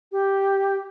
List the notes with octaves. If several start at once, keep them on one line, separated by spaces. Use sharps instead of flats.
G4